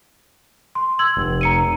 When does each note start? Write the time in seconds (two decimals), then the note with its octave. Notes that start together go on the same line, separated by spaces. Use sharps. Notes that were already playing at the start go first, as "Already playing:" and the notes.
0.75 C6
0.99 E6 G#6 F#7
1.17 F1
1.41 A#5 C#7 D#7